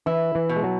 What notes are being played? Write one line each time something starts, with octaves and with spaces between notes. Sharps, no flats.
E3 E4
E3
B2
G#3
F#3